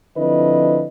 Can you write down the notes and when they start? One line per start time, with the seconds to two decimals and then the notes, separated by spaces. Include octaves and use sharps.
0.17 D3 F3 C4 E4 B4 D#5